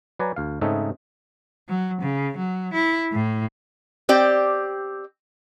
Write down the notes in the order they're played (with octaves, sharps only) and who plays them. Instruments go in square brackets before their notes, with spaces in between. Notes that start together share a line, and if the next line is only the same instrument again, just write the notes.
[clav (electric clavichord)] F#3 B4 D5 G#5 A#5
D2 F5
G#2 C#3 A3 C4 D#4 E5
[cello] F#3
C#3
F#3
E4
A2
[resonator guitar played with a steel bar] C4 G4 D5